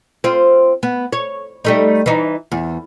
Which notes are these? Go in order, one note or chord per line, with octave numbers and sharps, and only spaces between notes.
C4 F4
B3
C#5
G3 A3 D#4
E3 D#4
E2